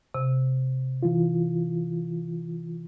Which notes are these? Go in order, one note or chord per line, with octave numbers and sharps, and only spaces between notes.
C3
E3 F4